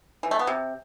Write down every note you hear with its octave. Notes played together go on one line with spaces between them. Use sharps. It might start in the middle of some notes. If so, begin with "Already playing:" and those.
E3
A3
B3
C3